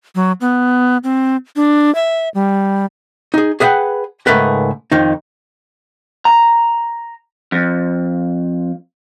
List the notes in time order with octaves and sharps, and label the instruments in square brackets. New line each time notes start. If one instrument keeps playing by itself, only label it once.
[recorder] F#3
B3
C4
D4
E5
G3
[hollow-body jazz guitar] D#4 G#4
G#4 B4 D#5 E5 F#5 G5
C#2 G#2 A3 A#4 B4
F2 D#3 D#4
[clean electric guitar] A#5
F2